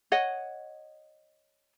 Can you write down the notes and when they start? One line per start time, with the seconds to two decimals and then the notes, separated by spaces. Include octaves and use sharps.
0.12 C#5 D#5 F#5